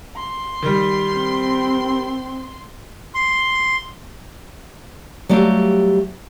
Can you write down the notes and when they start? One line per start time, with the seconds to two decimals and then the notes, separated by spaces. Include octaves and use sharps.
0.16 C6
0.62 D#3 G3
1.15 C4
3.15 C6
5.29 F#3 G3 A3 G4 F5